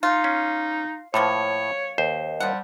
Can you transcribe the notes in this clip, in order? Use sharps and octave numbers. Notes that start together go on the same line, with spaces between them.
D#4 F4
C#4
A2 F3 A#3 B3 C#5
D#2 C5
F3 G3 F#5